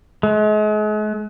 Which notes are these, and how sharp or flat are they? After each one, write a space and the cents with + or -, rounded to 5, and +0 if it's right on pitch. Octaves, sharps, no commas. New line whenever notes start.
G#3 +40